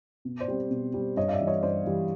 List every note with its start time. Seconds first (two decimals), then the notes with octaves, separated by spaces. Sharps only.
0.25 B2
0.40 C5 D5
0.48 G3 C4
0.71 B2
0.94 G3 C4
1.17 G2 C#5 D#5
1.28 F5
1.33 D5 E5
1.40 E3 G3
1.47 C#5 D#5
1.63 G2 C5 D5
1.86 E3 G3